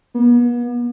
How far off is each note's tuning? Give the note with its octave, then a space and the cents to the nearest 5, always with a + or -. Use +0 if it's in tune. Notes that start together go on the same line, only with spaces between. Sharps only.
B3 -40